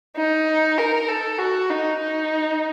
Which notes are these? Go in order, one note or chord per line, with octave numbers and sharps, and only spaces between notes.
D#4
A#4
A4
F#4
D#4
D#4